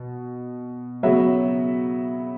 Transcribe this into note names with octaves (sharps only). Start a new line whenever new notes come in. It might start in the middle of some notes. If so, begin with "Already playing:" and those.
Already playing: B2
C#3 F#3 B3 F#4 E5